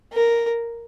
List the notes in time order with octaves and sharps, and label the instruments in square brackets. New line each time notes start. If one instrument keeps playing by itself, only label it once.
[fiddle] A#4